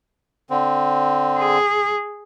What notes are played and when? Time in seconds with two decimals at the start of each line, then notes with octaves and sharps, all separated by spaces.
0.50 D3 C4
1.39 G#4